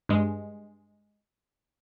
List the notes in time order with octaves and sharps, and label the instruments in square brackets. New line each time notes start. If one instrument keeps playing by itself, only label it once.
[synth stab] G2 G#3